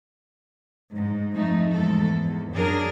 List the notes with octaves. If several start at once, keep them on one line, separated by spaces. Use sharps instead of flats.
G#2
F2 A3 D#4
E2 G#2 A4
E2
F#2 D4 G#4 A#4